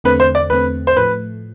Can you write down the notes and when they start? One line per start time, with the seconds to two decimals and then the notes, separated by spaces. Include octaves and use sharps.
0.04 E2 D3 A3 C4 B4
0.20 C5
0.35 D5
0.50 E2 D3 A3 C4 B4
0.87 C5
0.96 A2 F3 A3 B4